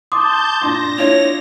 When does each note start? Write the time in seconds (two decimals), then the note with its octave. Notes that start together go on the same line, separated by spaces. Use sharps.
0.12 A5 C6 D6 D#6 G6
0.62 A#2 D4 C6 A#6
0.99 D4 E4 F4 C#5 F7